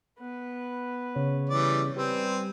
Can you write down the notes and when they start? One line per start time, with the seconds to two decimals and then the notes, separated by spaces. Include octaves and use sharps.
0.19 B3 B4
1.16 C#3 C#5
1.49 E3 G3 D5
1.97 G3 C4 B4 G#5